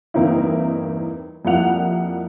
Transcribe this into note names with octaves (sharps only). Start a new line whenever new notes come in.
E2 G2 A#3 C4 D#4 E4
F2 G3 A#3 E4 F#5 F7